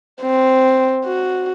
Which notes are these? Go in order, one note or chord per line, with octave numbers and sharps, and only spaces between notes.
C4
F#4